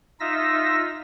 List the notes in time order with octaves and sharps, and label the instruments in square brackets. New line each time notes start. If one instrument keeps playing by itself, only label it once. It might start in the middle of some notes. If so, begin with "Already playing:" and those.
[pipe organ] D#4 F4 E5 E6 A#6